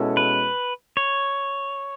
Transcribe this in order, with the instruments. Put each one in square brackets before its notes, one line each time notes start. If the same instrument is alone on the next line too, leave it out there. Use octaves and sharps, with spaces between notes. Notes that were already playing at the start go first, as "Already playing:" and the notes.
Already playing: [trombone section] B2 G#3 C#4 E4 A4
[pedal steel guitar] B4
C#5